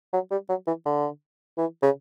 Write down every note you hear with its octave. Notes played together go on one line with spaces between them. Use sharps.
F#3
G3
F#3
E3
D3
E3
C#3